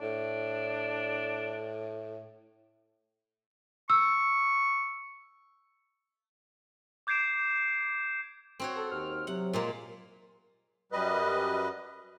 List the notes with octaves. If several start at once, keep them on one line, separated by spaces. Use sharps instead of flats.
A2 D4
C#6 E6
D6 G6 G#6 C7 D7 E7
C4 F#4 C#5
A4
D#2 F6
C3 F#3 F#5
A#2 G#3 A#3
F#2 G3 B4 D#5